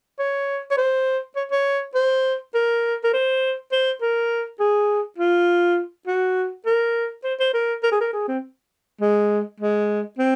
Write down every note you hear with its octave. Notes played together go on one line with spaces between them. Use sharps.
C#5
C#5
C5
C#5
C#5
C5
A#4
A#4
C5
C5
A#4
G#4
F4
F#4
A#4
C5
C5
A#4
A#4
G#4
A#4
G#4
C4
G#3
G#3
C4